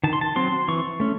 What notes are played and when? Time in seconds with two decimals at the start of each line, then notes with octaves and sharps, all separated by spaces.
0.03 D#3 A5
0.13 C6
0.21 A5
0.36 F#3 C4 C6
0.68 E3 C#6
1.00 A3 C#4